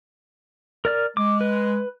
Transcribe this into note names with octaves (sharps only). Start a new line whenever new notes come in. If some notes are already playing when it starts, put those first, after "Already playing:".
A#4 D5 F6
G#3 D6
B4